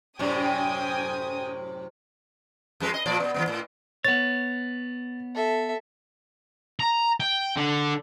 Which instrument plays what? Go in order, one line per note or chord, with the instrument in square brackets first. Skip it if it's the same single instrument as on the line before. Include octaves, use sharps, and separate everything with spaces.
[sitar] F#2 A2 C3 [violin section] G5 G#5 D#6
[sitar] F2 G#3 B4
D#5
A#2 F3 D5
B2 B3
E3 F3 B3
A2
[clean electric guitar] B3 C#5 [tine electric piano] A6
[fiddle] A4 E5
[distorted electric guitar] A#5
G5
D3